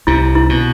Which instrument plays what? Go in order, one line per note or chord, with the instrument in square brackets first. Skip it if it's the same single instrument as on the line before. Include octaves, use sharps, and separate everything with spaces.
[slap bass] C2 C3 [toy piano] E4
[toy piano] E4
[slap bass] B2